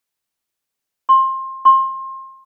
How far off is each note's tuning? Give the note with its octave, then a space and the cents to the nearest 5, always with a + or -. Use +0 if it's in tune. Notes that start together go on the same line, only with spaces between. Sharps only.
C6 +25
C6 +30